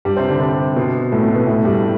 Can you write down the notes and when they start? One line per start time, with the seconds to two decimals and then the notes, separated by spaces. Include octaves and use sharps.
0.05 G2 G3
0.17 C3 C4
0.29 D3 D4
0.41 C3 C4
0.76 B2 B3
1.12 A2 A3
1.23 B2 B3
1.36 B2 B3
1.47 A2 A3
1.65 G2 G3